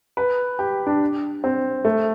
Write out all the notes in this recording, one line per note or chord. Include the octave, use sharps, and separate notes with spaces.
B4
G4
D4
C4
A3